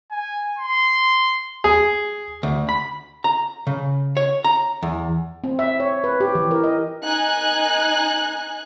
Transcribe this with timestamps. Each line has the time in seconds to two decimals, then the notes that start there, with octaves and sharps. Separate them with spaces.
0.12 G#5
0.58 C6
1.64 G#4
2.43 D2
2.69 B5
3.24 A#5
3.67 C#3
4.17 C#5
4.45 A#5
4.82 E2
5.44 C4
5.59 E5
5.80 C#5
6.04 B4
6.20 G4
6.35 E3
6.51 A#4
6.64 D#5
7.04 D#4 G#5 F#6